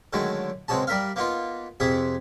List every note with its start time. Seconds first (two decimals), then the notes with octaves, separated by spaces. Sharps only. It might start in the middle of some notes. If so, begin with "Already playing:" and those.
0.13 D3 D#3 F#3 G#3 A3
0.68 C#2 G#3 C4 F#4 G#4 A5
0.87 G3 A#4 E5 F5
1.16 A#3 B3 D#4 F4
1.80 F2 C3 G#4 E5 D#6